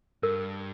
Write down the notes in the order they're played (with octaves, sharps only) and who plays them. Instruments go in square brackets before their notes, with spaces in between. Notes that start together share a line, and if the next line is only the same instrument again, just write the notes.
[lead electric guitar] G2 [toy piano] A#4